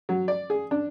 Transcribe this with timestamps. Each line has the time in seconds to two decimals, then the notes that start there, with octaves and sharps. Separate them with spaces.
0.09 F#3
0.28 D5
0.50 G#4
0.71 D4